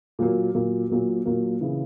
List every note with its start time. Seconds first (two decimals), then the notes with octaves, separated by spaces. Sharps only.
0.19 A#2 F#3 A#3
0.54 A#2 F#3 A#3
0.90 A#2 F#3 A#3
1.26 A#2 F#3 A#3
1.61 C#3 E3